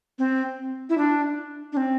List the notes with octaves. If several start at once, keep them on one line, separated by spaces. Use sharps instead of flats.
C4
E4
D4
D4
C4